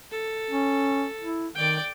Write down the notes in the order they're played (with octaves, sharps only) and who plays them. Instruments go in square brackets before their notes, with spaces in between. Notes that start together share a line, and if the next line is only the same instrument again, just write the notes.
[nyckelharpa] A4
[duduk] C#4
E4
[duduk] D#3 [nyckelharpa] D5 G5